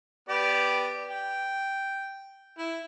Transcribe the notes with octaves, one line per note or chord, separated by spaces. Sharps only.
B3 G4 D5
G5
E4